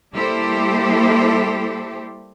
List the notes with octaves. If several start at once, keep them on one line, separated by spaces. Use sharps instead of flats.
G3 A#3 E4 G4 A4 C5